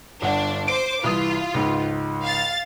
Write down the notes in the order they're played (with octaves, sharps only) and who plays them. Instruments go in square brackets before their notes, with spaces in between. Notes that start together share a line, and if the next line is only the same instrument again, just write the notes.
[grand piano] G1 F#5 [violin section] D4
[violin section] C5 D6 [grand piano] D7
[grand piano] C2 E3 D#6 [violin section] F4
[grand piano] C#2 G#2
[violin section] F5 A6